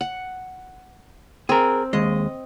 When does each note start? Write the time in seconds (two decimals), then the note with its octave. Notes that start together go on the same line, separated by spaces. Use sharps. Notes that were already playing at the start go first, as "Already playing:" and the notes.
0.01 F#5
1.49 C4 G#4 A#4
1.93 D#2 G#3 D#5